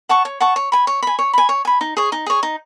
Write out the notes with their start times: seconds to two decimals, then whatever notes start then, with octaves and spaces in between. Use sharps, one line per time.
0.09 F#5 A5 C#6
0.25 C#5
0.40 F#5 A5 C#6
0.56 C#5
0.72 G#5 B5
0.87 C#5
1.02 G#5 B5
1.19 C#5
1.33 G#5 B5
1.49 C#5
1.65 G#5 B5
1.81 D#4
1.97 G#4 C#5
2.12 D#4
2.26 G#4 C#5
2.43 D#4